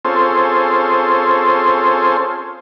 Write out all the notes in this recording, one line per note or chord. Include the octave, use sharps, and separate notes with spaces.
C4 C#4 F4 G#4 A4 C5